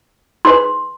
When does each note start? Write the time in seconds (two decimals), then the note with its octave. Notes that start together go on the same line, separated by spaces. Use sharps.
0.45 D#4 G#4 B4 C6